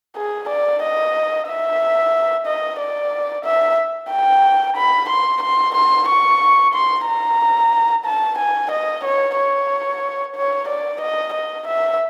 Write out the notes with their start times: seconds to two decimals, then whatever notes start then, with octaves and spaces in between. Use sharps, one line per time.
0.17 G#4
0.49 D5
0.83 D#5
1.48 E5
2.47 D#5
2.80 D5
3.45 E5
4.11 G5
4.77 B5
5.09 C6
5.42 C6
5.75 C6
6.08 C#6
6.74 C6
7.07 A#5
8.06 A5
8.38 G#5
8.72 D#5
9.04 C#5
9.37 C#5
10.36 C#5
10.69 D5
11.01 D#5
11.34 D#5
11.67 E5